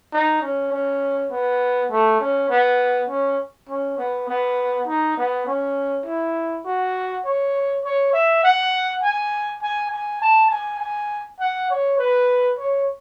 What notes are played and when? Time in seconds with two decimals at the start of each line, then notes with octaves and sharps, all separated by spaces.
0.13 D#4
0.42 C#4
0.72 C#4
1.31 B3
1.91 A3
2.21 C#4
2.50 B3
3.09 C#4
3.69 C#4
3.98 B3
4.29 B3
4.87 D#4
5.17 B3
5.47 C#4
6.06 E4
6.66 F#4
7.25 C#5
7.85 C#5
8.13 E5
8.44 F#5
9.02 G#5
9.62 G#5
9.91 G#5
10.22 A5
10.51 G#5
10.80 G#5
11.40 F#5
11.70 C#5
11.99 B4
12.59 C#5